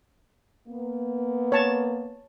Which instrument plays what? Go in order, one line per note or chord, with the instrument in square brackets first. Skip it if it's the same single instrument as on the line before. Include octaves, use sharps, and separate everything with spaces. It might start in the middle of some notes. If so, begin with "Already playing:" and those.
[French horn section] A#3 B3
[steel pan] C#5 A5